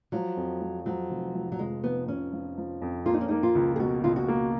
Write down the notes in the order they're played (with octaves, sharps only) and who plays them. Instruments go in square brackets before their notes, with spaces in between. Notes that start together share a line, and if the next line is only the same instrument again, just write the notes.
[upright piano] F3 [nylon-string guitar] F#3
[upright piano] F2
F3
[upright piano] F3 [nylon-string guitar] F#3
[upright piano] F1
F3
[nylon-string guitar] F#3
[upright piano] F1 [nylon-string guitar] G#3
[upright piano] F1 [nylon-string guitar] B3
[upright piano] F1 [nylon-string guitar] C#4
[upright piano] F3
F3
F2
[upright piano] A#3 [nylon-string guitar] F4
[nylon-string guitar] D#4
C#4
[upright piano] A#3 [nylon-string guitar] D#4
[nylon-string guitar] F4
[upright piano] C#2
[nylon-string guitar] G#4
[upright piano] B2 [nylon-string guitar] F#4
[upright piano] C#2 [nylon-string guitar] F4
[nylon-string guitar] F#4
[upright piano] A#3